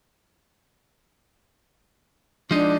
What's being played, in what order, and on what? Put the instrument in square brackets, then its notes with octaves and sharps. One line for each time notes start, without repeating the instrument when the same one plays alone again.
[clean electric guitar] F3 G#3 D#4 [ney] D4